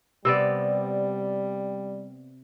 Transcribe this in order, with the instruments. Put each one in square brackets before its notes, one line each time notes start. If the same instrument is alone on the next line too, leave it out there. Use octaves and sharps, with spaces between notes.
[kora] C3 B3 D5 [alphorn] G3 [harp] E6